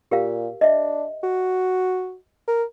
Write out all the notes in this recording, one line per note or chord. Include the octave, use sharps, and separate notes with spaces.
A#2 G4 A#4 F5
D4 D#5 E5
F#4
A#4